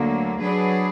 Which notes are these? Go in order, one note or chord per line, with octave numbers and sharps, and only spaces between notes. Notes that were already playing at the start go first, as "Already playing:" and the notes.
Already playing: D2 D3 F#3 A#3
F#3 D4 G#4 B4 D5